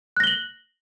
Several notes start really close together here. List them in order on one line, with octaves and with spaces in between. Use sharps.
F#6 A#6 G7 F#7